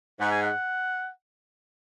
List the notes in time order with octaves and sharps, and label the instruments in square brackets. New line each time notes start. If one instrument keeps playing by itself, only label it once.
[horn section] G#2 [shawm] F#5
[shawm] G#5
F#5